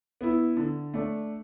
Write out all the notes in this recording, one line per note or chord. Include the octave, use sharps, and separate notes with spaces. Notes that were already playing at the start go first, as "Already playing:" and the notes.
B3 E4
D3
A3 D4